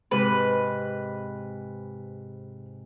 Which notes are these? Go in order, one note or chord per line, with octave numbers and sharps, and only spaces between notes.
G#2 C3 B4